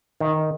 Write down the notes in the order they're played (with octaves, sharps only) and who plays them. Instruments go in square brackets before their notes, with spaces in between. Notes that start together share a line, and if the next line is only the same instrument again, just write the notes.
[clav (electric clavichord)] D#3